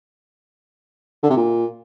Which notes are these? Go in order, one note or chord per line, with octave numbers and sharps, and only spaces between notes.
D3
C3
A#2